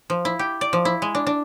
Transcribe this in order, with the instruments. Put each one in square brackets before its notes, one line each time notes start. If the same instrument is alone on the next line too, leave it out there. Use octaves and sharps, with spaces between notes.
[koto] F3
E4
G4
D5
F3
E4
G#3
D4
D4